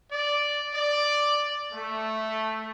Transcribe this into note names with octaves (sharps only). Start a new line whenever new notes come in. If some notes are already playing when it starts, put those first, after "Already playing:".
D5
D5
A3